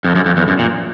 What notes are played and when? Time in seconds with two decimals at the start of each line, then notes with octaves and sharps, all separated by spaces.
0.04 F2
0.15 F#2
0.26 F2
0.37 E2
0.48 F#2
0.59 A#2